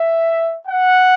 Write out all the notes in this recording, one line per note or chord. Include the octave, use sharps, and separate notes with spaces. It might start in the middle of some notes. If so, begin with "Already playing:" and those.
Already playing: E5
F#5